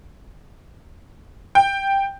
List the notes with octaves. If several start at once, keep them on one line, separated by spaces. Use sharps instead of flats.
G5